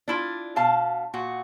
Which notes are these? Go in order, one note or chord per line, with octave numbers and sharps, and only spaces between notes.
D4 E4 F4
B2 F5 A5
A#2 F#4